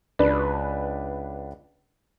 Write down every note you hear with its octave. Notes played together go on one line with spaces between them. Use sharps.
C#2 D4 B4